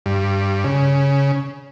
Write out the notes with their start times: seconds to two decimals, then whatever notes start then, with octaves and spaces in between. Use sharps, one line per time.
0.06 G2
0.64 C#3